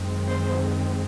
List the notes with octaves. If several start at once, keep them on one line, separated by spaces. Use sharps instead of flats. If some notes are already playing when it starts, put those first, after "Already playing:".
Already playing: F#2 D#3 G#3 C4
C5